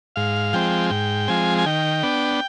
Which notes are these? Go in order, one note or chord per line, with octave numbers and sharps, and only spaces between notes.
G#2 F5
F3 G#3 C4 G5
G#2 G5
F3 G#3 C4 G#5
G#5
D#3 G5
B3 D4